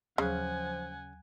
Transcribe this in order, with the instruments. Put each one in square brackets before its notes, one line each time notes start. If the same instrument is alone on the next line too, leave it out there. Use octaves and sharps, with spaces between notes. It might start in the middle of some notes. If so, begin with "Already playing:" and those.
[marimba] D#2 F#3 F#6 [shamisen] C#3 [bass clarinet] F3 [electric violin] F#5 G#5